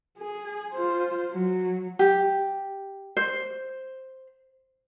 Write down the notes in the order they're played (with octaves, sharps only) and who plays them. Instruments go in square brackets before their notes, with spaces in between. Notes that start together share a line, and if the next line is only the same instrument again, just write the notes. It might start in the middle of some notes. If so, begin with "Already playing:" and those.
[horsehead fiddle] G#4
F4 C5
F#3
[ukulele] G4
C5